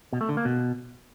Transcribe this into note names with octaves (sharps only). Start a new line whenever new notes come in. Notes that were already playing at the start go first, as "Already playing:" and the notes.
B2
A3
D3
A#3
B2